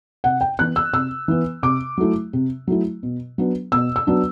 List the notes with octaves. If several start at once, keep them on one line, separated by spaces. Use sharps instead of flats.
C3 F#5
G5
E3 B3 F#6
E6
C3 E6
E3 B3
C3 D6
F#3 A3 E4
C3
F#3 A3 E4
B2
F#3 B3 D4
B2 E6
E6
F#3 B3 D4